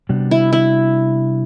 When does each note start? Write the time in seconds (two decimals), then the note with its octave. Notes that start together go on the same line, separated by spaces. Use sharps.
0.09 C3 G3 B3 D4 F#4
0.31 E4
0.53 E4